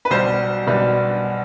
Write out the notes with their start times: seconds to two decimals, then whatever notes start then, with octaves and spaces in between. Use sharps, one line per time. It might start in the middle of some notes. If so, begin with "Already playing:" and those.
0.05 B4
0.10 B1 B2 G3 C5
0.66 B1 B2 G3 B4